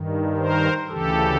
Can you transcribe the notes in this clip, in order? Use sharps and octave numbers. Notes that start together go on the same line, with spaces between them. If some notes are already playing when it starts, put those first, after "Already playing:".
Already playing: G2 D#3
A#4 C5
D2 C#3 E3 G4 A4